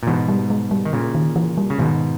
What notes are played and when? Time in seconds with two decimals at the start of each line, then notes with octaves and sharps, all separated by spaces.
0.03 A#2
0.07 G#2 B2 E3
0.29 G3
0.50 G#3
0.71 G3
0.85 D#3
0.93 A#2 C#3
1.15 D#3
1.36 E3
1.57 G3
1.70 C#3
1.79 G#2 B2 D#3